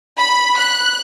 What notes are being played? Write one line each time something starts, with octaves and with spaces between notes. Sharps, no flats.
B5
F#6